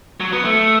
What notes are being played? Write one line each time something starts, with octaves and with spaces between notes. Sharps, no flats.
F#3
B3
A3